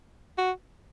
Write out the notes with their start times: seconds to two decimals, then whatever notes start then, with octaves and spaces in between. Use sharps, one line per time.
0.37 F#4